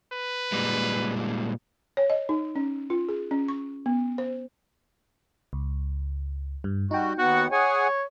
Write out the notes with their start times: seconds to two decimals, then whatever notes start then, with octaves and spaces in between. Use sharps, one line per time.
0.13 B4
0.52 A#2 G3 G#3
1.97 C#5
2.10 D#5
2.29 D#4
2.56 C#4
2.90 F4
3.09 G#4
3.31 C#4
3.48 C#6
3.86 B3
4.18 C5
5.53 C#2
6.64 G2
6.91 G3 D#4 F#4 G5
7.18 D#2 B3 F#4 F#5
7.52 G#4 C#5 F#5 G#5